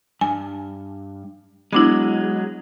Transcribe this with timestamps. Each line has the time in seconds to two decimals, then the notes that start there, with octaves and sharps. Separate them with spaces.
0.21 G2 G#5
1.73 F#3 G#3 B3 D4 E4